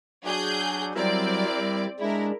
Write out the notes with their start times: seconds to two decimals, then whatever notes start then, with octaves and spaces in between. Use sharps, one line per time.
0.25 F#3 D4 G#4 G6
0.95 F#3 G3 C4 E4 A#4 D5
1.58 G3
2.00 G#3 D4 E4 A#4